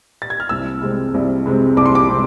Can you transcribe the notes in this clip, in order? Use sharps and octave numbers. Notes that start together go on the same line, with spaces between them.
A6
G#6
F6
C2 E6
C3 G#3 C4
C2
C3 G#3 C4
C2 D6
C6
D6
C3 G#3 C4